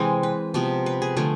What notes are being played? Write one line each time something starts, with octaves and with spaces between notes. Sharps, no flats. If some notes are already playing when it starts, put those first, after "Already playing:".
Already playing: C3 E3 G#3 C4
B4
C3 F3 B3
B4
G#4
D3 F3 A3 G#4